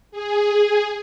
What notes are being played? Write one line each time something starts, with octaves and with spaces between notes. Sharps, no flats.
G#4